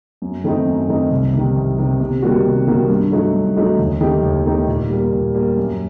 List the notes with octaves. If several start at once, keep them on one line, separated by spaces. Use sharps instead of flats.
F#2
D#3 A3 C4 D#4
F#2
D#3 A3 C4 D#4
C2
C3 D#3
C2
C3 D#3
C3
D#3 G3 A#3 F#4
C3
D#3 G3 A#3 F#4
G2
F#3 A3 D#4 F#4
G2
F#3 A3 D#4 F#4
D#2
D#3 A3 D#4 G4
D#2
D#3 A3 D#4 G4
A#2
G3 A#3
A#2
G3 A#3
F#2